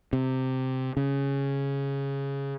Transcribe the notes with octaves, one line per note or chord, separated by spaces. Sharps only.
C3
C#3